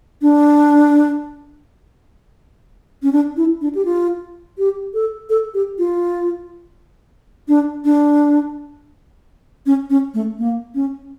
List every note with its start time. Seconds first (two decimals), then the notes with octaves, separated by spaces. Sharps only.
0.22 D4
3.02 C#4
3.12 D4
3.36 E4
3.61 D4
3.75 G4
3.85 F4
4.58 G4
4.94 A4
5.29 A4
5.54 G4
5.78 F4
7.48 D4
7.84 D4
9.66 C#4
9.90 C#4
10.14 A3
10.38 A#3
10.75 C#4